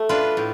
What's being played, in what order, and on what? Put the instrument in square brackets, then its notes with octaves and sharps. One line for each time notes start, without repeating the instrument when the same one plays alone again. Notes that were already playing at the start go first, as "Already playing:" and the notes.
Already playing: [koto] A3
D4 F4 B4
A2